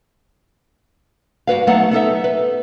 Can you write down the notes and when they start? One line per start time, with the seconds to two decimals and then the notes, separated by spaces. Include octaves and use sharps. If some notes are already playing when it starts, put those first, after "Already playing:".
1.47 G2 F#4 B4 F5
1.67 F#3 A3 B3 D#4 F#4 F#5
1.91 B3 D#4 A4 E5
2.24 B4